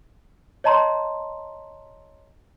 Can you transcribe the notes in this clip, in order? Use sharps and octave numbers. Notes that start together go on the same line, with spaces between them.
C#5 D#5 A5 A#5 C6